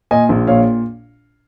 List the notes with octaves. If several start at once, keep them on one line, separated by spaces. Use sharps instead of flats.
A#2 D#5 G#5
A#1
A#2 C#5 F5